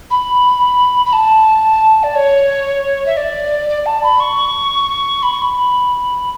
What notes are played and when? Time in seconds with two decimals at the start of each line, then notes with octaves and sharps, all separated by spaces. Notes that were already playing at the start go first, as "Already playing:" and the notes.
0.11 B5
1.06 B5
1.13 A5
2.03 D5
2.15 C#5
3.06 E5
3.17 D5
3.69 D5
3.86 A5
4.03 B5
4.20 C#6
5.23 B5
5.32 C#6
5.42 B5